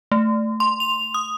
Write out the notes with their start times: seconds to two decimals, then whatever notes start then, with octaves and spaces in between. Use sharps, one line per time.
0.12 A3
0.60 C6
0.80 F7
1.14 D#6